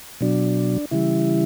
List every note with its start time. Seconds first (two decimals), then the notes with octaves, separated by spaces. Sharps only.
0.21 B2 F#3 D4
0.91 C#3 E3 G3 E4